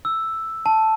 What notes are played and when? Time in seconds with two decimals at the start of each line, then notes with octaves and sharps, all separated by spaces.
0.05 E6
0.66 A5